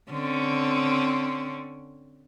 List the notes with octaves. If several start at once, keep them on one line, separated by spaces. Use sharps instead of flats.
D3 C4 C#4